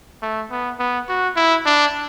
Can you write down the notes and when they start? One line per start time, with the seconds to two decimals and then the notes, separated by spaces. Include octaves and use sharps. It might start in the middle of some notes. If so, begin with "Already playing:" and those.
0.22 A3
0.51 B3
0.79 B3
1.08 F#4
1.36 E4
1.66 D4